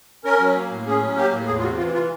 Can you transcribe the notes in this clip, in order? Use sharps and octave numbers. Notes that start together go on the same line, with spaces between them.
C#4 A#4
F#3
A#3
A2
C#4 G#4
F#3
A#3 G4
A2
E2 G#4
F4
C3 F#4
E3 F4
F4